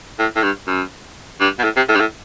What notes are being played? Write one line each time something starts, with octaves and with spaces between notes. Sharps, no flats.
A2
A2
G2
F#2
G2
B2
A2
C3
A2
G2
A2